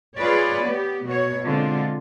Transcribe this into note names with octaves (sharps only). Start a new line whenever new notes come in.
F4 G#4 B4 C#5 D5
B3 G4
B2 F#4 C#5
D3 G#3 C4 F4